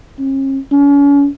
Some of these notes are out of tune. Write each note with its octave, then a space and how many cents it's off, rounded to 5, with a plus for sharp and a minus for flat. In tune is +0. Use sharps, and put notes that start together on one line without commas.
C#4 -45
C#4 +40